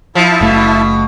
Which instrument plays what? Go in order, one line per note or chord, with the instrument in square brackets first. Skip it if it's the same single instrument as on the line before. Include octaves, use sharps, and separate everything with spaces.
[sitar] F3 [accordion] E4 E5 A5
[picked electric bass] F#1 A3 [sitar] B2